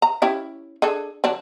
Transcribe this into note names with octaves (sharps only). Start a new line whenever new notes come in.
A#5
C#4 E4 G4
D4 G#4 A4
D3 F#3 D4